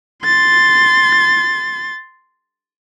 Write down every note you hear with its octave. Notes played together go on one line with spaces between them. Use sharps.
C6 A6